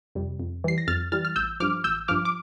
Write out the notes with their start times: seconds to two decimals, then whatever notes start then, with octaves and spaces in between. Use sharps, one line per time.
0.15 F2 C3 G3
0.40 F2
0.64 E3 G3 C7
0.78 A#6
0.88 F2 F6 A6
1.12 E3 G3 F6 A6
1.25 F6
1.36 A1 E6 G6
1.60 G2 F3 D6 F6
1.84 A1 E6 G6
2.08 G2 F3 D6 F6
2.25 D6